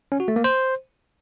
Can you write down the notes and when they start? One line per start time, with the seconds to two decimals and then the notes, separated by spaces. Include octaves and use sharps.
0.12 C#4
0.20 F#4
0.28 A3
0.36 A#3
0.44 C5